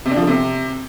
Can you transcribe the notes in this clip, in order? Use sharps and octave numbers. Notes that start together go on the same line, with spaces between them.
C3
D4
F3
D3
C3